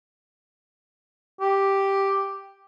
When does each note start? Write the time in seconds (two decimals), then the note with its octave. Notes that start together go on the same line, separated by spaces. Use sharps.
1.41 G4